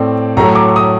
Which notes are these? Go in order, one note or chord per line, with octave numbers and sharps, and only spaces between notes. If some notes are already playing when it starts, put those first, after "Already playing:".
Already playing: A2 A3 C4 D5
A2 F#3 A3 A#5
D6
D#6